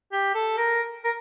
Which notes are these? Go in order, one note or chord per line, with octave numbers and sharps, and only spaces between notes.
G4
A4
A#4
A#4